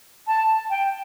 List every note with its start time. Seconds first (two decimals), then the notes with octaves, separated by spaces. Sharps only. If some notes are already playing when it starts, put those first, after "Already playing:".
0.27 A5
0.70 G5